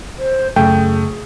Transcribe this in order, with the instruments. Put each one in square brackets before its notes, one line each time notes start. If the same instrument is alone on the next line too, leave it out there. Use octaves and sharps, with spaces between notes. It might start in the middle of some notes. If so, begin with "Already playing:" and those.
[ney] C5
[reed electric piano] F#2 C#3 [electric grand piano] A3 [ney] G#4 [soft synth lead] G5